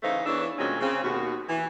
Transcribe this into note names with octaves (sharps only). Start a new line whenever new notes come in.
C#3 E3 A3 D#4 C5 F5
E2 E3 D4 C#5 E5
D2 A#2 F#3 G#3 C4 C#4
C#3 C4
D#2 B2 F#4
E3